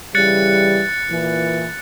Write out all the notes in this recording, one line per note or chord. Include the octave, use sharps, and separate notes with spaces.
C#3 E3 G3 F#6 A6 C#7
A#2 E3